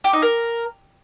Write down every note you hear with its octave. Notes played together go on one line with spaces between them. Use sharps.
G4
D#4
A#4